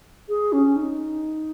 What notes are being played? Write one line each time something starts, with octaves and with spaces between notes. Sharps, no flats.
G#4
C#4
D#4